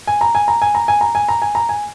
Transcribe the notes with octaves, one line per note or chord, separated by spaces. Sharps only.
G#5
A#5
G#5
A#5
G#5
A#5
G#5
A#5
G#5
A#5
G#5
A#5
G#5